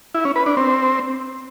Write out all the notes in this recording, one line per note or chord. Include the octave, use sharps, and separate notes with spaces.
E4
C#4
B4
D4
C4